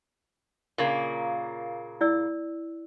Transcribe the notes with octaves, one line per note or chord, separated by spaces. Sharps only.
A#2 C#3 A#3
E4 D5 E6